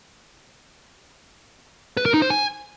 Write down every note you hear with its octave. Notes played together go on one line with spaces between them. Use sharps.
B4
A#4
D#4
C5
G#5